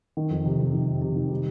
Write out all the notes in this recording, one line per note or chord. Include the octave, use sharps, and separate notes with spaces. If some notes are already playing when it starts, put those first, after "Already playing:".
D#3
F2
C3
F2
D#3
F2
C3
D#3
G3